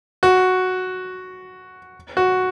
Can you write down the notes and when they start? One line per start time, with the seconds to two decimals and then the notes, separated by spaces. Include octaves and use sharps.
0.23 F#4
2.17 F#4